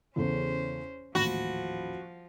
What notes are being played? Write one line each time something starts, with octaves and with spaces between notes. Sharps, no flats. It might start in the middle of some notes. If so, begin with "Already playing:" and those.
E2 C#3 C#4 A4 C5
D#1 A1 F3 F#4 B5